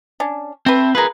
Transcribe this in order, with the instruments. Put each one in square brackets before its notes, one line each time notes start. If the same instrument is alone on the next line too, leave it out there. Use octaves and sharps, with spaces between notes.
[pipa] C#4 D4
[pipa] A3 B4 [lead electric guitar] C4
[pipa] F4 A#4 [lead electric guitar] G#4 B4